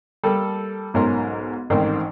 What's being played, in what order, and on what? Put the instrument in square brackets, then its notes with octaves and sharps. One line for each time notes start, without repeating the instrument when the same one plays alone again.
[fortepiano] G3 A#3 A4
B1 G#2 C#4 A#4 C6
A1 G#2 D#3 C4 C5